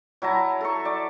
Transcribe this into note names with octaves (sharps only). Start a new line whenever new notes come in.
F#3 E4 A5 A#5
A4 C#6
D5